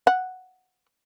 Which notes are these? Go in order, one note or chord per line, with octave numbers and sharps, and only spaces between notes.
F#5